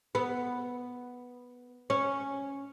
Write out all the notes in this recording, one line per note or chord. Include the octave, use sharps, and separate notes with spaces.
B3
C#4